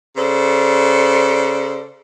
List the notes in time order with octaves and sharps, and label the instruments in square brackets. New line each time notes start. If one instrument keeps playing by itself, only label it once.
[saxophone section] C#3 A4 C5 D5